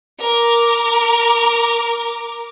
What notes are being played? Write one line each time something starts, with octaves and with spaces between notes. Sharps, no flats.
A#4 D6